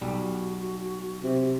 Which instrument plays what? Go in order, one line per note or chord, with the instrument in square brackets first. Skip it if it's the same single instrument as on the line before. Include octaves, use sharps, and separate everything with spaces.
[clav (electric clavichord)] B1 G3 [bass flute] F#4
[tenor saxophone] C3